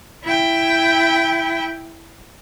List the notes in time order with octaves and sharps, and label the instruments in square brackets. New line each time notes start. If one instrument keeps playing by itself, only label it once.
[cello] E4 G5